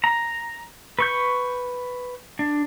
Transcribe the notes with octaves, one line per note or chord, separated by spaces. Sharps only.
A#5
B4 C#6 G6
D4